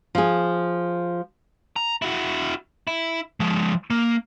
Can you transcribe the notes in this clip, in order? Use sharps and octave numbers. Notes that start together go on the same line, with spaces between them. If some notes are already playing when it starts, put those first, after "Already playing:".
F3 G#4
A#5
E4 F#4
E4
F3 G#3
A#3